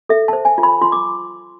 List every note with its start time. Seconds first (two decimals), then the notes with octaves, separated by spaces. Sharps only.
0.09 A4 E5
0.28 C5 A5
0.45 G#5
0.58 F4
0.63 B5
0.82 F4 C6
0.92 D6